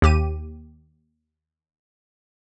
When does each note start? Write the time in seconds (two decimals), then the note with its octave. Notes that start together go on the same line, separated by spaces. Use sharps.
0.02 D#2 G4 D#7